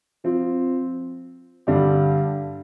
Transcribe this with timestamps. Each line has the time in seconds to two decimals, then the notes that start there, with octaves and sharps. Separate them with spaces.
0.24 F3 C4 F4
1.67 G2 D3 G3 D4 G4